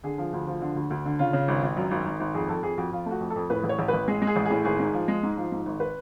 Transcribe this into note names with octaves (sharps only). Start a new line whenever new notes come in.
D3 G#4
F3
D2
F3
D3
D2
D2
D3
C#3 F4
C#3
G#1
G#1
F#2
G#1
G#1
G#1
F2 G#4
F2 A4
F2 G#4
F2 F#4
F2 F4
A3 F#4
F2
A4
F2
A2 B4
A1
C#5
A1
B4
A1
G#3 G#4
G#3
G#4
A1
G#4
A2
G#1 G#4
G#2
F3
G#3
G#2
F3
G#2
G#1
B4